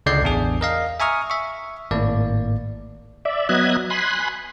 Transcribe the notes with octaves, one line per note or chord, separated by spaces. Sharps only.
C#2 D3 G#3 D5 G6 C7
A1 E2 D4 G#4
A#4 D#5 F5
E5 G#5 A#5 C#6 D#6 F6
E5 C#6
G#1 A2 A#3 D5
D5 E5
F#3 B3 D#5 E5 F#6 G#6
G#5 B5 C6 F#6